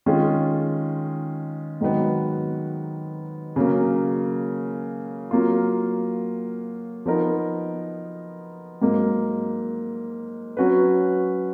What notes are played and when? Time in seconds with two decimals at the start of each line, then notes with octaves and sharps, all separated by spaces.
0.06 D#3 G#3 C#4 F4 G#4
1.81 G#2 D#3 F#3 B3
3.56 C#3 F#3 A#3
5.31 F#3 A#3 F4
7.06 F3 B3 D#4 A#4
8.82 G#2 F#3 A#3
10.57 F#3 C#4 F#4 B4